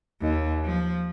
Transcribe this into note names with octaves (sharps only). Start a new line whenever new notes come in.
D#2
F3